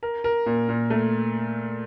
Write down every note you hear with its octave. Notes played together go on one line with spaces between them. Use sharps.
A#4
A#4
A#2
A#2
A3